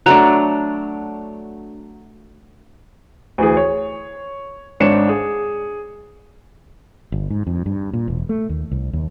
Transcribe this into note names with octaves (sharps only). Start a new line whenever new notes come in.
F#3 A3 D4 A#5 F#6
D2 E3 G#4
C#5
G#1 G#2 D4 C#5 C#7 E7
G#4
G1
G#2
F2
G2
A#2
E1
A3
D#2
C2
D#2